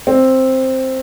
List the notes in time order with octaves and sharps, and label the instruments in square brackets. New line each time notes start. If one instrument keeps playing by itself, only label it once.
[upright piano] C4